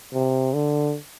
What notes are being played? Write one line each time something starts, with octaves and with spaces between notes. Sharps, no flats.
C3
D3